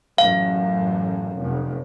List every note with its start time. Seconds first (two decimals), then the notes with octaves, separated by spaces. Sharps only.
0.18 A1 F#2 F5
1.35 F1